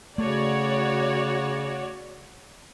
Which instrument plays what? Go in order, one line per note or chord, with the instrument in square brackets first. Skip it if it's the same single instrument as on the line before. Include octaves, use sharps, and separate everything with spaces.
[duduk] C#3 [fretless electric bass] A3 [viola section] F#4 C#5 D5